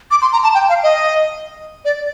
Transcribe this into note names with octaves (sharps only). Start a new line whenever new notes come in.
D6
C6
A#5
A5
G5
F5
D#5
D5